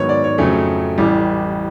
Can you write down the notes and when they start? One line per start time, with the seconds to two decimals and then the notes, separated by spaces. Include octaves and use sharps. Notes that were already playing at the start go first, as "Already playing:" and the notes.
Already playing: G#2 D#3 F#3 B3 C#5 D#5
0.09 D5
0.24 C#5
0.38 F2 C#3 F#3 A3 C#4
0.98 A1 A2 E3 G3